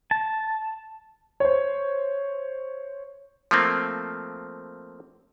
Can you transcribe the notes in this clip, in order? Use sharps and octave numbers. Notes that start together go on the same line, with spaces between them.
A5
C5 C#5
F3 A3 A#3 C4